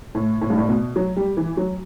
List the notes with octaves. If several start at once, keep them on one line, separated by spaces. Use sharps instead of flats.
A2
A2
G2
A2
B2
F#3
G3
E3
F#3